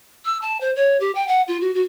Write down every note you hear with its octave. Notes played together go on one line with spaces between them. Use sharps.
E6
A5
C5
C#5
G4
G5
F#5
F4
F#4
F#4